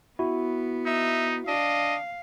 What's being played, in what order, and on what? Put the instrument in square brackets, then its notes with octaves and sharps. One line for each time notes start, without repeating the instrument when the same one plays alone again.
[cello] B3 [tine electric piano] E4 F#4
[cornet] D#4 [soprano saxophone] E5
[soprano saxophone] D4 [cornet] D#5 [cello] F5